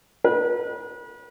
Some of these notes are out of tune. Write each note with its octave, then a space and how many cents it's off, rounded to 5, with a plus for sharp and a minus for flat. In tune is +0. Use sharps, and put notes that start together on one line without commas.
B4 -35